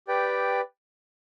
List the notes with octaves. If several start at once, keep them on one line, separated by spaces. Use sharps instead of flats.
G4 B4 D5 G5